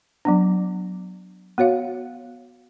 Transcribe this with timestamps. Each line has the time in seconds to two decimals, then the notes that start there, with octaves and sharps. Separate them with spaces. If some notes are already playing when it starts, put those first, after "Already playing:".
0.25 F#3 B3 D4
1.58 B3 F#4 C#5 F5